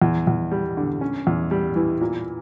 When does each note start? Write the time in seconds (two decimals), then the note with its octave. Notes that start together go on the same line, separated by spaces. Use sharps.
0.02 E2
0.27 E2
0.51 G3
0.77 D3
1.01 C#4
1.27 E2
1.51 G3
1.76 E3
2.01 A#2